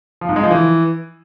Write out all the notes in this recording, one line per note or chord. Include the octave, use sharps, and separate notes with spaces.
F3
G#2
G#3
F3
E3